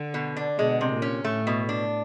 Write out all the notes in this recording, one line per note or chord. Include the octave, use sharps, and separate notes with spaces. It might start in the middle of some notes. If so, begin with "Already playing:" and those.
Already playing: D3
B2
D4
B2 G#3
C3
A#2
C#4
A2 A3
B2
D4